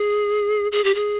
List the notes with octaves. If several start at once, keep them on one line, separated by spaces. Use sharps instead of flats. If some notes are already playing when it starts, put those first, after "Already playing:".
Already playing: G#4
G#4
G4
G#4